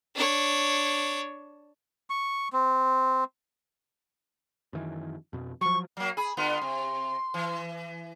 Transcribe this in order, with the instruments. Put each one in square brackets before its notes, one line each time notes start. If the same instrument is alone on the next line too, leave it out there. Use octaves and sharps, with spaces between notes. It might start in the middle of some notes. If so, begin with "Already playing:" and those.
[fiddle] D4 C#5
[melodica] C#6
C4
[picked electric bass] F#2 D#3 E3
F2 B2
[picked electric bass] F3 F#3 [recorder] C#6
[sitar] F#3 A#3
[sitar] G#4 [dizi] B5
[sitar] D3 B3 F4 [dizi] C6
[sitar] C3
E3